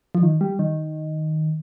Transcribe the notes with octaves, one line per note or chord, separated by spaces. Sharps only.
F3
D#3
G3
D#3